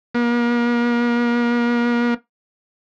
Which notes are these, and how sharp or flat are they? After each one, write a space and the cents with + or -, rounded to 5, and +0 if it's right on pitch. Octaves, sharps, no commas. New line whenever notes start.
A#3 +40